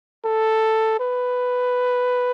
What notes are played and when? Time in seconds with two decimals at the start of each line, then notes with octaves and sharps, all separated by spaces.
0.25 A4
1.00 B4